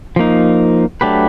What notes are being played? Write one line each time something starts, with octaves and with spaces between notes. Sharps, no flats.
F3 A#3 D#4
F#3 A3 D4 G4 B4